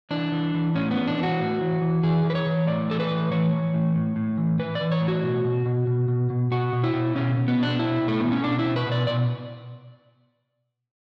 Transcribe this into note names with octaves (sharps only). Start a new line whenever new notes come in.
E3 D4
E3
E3
A2 C#4
B3
E3
D4
E3 F#4
A2
E3
E3
E3 G#4
E3 B4
C#5
E3
A2 D5
E3 A4
B4
A2
E3 C#5
E3
A2
A2
A2
E3
E3 B4
D5
E3
C#5
A2
F#4
B2
B2
B2
B2
B2
B2
B2 F#4
B2
E4
B2
B2 C#4
B2
B3
B2 D4
B2 E4
B2
A3
B2 B3
C#4
B2 D4
E4
B2
B4
B2
D5
B2 D5